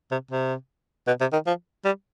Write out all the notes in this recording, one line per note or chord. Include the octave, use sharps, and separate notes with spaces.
C3
C3
B2
C3
D#3
F3
G3